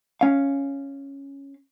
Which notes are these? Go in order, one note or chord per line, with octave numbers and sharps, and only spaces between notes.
C#4 F5